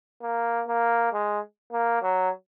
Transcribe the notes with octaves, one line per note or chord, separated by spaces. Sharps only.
A#3
A#3
G#3
A#3
F#3